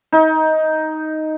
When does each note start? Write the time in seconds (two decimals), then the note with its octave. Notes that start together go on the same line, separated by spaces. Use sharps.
0.12 D#4